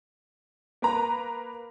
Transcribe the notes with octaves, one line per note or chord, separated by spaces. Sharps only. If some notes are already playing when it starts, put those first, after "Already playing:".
A#3 B4 A#5